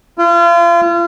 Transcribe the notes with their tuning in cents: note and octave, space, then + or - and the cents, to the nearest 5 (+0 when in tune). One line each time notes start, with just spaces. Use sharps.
F4 -35